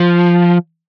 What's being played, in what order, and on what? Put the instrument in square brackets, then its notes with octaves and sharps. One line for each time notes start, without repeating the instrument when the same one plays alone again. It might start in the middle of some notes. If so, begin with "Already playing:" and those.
Already playing: [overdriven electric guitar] F3